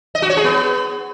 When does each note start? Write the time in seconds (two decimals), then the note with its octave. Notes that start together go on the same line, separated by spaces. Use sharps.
0.15 D#5
0.22 F#4
0.30 C#5
0.37 G#4
0.44 B3